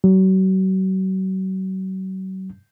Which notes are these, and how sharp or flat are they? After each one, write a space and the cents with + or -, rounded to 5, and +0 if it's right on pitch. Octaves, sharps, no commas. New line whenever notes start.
F#3 +35